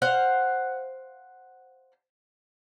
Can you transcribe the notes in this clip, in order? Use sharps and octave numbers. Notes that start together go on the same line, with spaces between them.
C5 F5 F#5